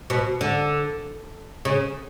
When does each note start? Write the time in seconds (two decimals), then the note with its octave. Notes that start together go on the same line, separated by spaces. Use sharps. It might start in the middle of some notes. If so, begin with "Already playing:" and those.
0.10 B2
0.41 D3
1.65 C#3